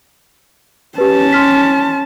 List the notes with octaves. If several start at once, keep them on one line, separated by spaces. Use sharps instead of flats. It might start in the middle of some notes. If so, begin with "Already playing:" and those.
C#4 G4 B4 A5
C6 F6 B6